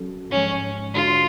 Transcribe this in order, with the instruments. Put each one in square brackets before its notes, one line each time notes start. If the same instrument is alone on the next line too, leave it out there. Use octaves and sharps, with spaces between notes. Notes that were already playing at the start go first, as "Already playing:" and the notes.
Already playing: [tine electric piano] F#3 C#4 F#4 A4
[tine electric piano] G#2 F3 G#3 [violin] C#4
[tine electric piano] D3 G#3 D4 F#4 A4 [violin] F4